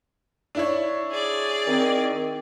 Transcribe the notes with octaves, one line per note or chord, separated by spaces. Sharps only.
D4 E4 C#5
G#4 D5
D#3 C4